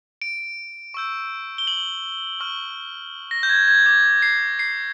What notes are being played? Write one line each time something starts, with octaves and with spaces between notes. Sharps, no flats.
D7
C#6 E6 G6
G7
F#7
C#6 F6
A#6
G6
G#6
G#6
D6 G6 G#6
C7
C7